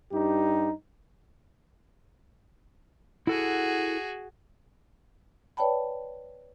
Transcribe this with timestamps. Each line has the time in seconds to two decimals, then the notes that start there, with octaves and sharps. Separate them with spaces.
0.12 G2 D#4 G4
3.27 E4 F#4 G#4 A4 F#5
5.57 B4 C#5 D5 G5 A5 B5